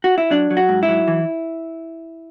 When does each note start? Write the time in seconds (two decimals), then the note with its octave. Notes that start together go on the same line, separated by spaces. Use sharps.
0.04 F#4
0.18 E4
0.30 F#3 D4
0.50 F#3
0.57 F#4
0.69 G#2
0.83 E4
0.89 F#3
1.08 E3